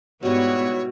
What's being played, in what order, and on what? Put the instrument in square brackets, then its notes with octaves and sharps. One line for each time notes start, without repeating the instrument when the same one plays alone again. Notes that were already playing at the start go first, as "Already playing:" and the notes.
[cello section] G#2 B3 [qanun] B2 G3 [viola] E4 F#4 [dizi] C#5